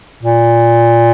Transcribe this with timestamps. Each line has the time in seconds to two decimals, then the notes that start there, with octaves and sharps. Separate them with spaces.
0.23 A#2